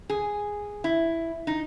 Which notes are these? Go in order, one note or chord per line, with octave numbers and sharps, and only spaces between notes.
G#4
E4
D#4